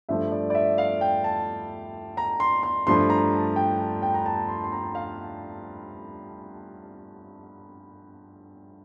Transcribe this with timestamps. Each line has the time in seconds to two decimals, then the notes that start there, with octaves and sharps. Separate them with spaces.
0.09 G2 F3 A3 E5
0.32 D5
0.50 D5
0.55 E5
0.78 F5
1.01 G5
1.24 A5
2.17 A#5
2.40 C6
2.63 C6
2.87 G2 F3 A3 C6
3.10 A#5
3.33 A5
3.56 G5
3.79 A5
4.02 G5
4.14 A#5
4.26 A5
4.49 C6
4.64 C6
4.72 A#5
4.95 F5